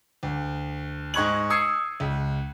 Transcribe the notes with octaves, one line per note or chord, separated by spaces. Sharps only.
D2
G#2 D#5 C#6 F#6 G#6 F#7
D#6 E6 G#6 C7 C#7
C#2